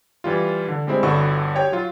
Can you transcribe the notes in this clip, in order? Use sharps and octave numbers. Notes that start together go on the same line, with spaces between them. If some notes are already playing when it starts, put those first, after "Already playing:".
E3 G3 F4
D3
G3 G#3 C4 E4
G1 D3 E4 F#4 C#6 E6
G4 C#5 G5
F#3 F4